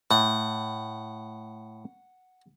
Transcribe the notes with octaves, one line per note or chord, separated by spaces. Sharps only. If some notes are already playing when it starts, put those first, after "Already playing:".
A2 F#5